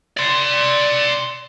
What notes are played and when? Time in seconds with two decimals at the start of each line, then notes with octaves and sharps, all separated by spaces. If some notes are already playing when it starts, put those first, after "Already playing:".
0.17 D5 C6